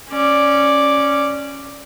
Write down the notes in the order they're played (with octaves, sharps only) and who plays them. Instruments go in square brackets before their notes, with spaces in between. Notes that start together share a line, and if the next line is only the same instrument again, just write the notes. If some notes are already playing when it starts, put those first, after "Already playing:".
[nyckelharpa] C#4 D5